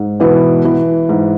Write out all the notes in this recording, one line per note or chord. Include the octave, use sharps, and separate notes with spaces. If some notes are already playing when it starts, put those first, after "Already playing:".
Already playing: G#2
B2 E3 B3
E3
G#2